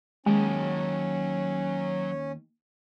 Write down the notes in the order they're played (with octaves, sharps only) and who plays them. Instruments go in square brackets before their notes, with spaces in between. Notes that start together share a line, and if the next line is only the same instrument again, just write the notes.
[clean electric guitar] D#2 [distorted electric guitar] F#3 A5 [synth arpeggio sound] G#3 [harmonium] C#4